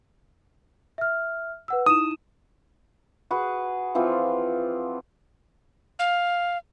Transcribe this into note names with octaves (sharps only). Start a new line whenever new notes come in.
E5 F6
B4 F#5 E6
D#4 E4 D#6 E7
F#4 G#4 B4
E3 F3 C4 F4
F5